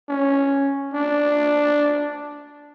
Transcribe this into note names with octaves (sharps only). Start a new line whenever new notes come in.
C#4
D4